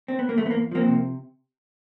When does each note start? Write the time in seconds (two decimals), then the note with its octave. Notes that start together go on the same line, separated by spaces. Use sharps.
0.08 C4
0.19 B3
0.29 A#3
0.38 E2 A3
0.46 B3
0.51 A#3
0.54 E2
0.71 F3 A#3 C4
0.88 C3